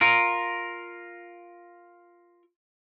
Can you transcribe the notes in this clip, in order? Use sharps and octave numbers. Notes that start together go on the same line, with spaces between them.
F4 A#4